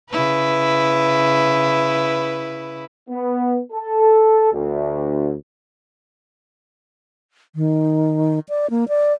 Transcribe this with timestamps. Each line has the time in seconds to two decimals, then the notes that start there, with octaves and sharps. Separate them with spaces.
0.10 C#3 E4 B4
3.10 B3
3.72 A4
4.52 D2
7.56 D#3
8.49 D5
8.70 A#3
8.89 D5